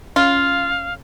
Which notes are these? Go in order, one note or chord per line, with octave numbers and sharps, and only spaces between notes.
C#4 F4 F5